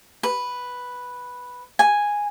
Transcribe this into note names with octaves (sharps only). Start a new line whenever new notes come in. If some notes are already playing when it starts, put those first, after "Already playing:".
B4
G#5